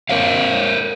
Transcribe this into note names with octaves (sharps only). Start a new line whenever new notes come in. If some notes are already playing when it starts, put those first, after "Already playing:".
A#4 C5 C#5 F5